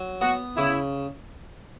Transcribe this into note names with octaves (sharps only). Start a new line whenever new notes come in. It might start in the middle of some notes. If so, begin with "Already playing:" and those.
Already playing: F#3
B3 F#4
C#3 E4